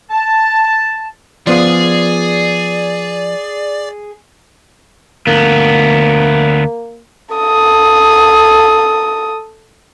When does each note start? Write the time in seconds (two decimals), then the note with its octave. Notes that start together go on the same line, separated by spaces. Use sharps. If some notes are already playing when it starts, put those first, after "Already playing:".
0.11 A5
1.47 F3 B3 F4 G#4 D5
5.27 D2 A#3 B3
7.35 A4 D#6